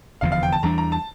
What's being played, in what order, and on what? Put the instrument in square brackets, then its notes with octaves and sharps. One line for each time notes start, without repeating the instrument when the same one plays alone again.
[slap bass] F1 E2 D3 F3 [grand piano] F5
[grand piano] F5
G5
A5
[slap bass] E2 E3 G3 D4 [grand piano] A#5
[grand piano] A#5
A5